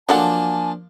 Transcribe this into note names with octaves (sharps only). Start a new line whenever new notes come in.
F3 F#3 A#3 D4 A4 F#5 G#5 A5